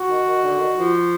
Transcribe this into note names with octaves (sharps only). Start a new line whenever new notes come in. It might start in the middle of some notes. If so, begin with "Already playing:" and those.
Already playing: F#4
D#3
D#3
D3
D#3
F3